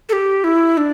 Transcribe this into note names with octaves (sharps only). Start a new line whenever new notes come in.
A4
G4
E4
D4